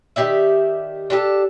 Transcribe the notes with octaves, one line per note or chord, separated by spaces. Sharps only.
D#3 G4 D5 E5
D4 G4 A4